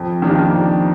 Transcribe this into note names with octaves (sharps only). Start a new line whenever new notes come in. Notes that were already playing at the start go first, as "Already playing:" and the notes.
Already playing: F2
D#3 A#3 D4 G4
F2